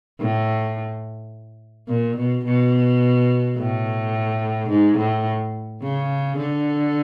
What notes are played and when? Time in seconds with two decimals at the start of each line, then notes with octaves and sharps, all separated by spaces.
0.21 A2
1.88 A#2
2.17 B2
2.45 B2
3.57 A2
4.70 G#2
4.98 A2
5.82 C#3
6.38 D3